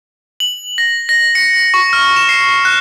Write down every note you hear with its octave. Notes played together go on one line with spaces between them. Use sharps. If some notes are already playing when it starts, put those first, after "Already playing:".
F#7
A#6
A#6
C#7
C#6
F6
E7
C7
F#6